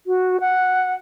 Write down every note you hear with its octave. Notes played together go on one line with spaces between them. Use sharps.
F#4
F#5